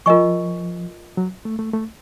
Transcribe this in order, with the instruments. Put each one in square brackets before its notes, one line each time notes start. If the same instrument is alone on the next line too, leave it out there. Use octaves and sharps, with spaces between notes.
[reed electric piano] F3 [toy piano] F4 A#4 D#5 G#5 C#6
[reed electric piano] F#3
A3
A3
A3